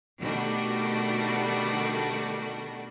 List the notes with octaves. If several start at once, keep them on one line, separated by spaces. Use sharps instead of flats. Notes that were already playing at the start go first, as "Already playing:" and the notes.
B2 D#3 G3 A3 D4 F#4